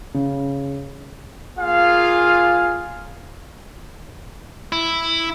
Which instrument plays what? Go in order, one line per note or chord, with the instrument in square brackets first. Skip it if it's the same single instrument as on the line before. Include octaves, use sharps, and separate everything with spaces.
[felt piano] C#3
[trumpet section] A#3 F4 G#4 F5
[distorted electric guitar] E4